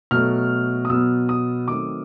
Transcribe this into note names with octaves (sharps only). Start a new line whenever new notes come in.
B2 F#3 A3 F6
D#6
B2 F#3 B3 E6
D#6
D#3 F#3 A3 C4 D6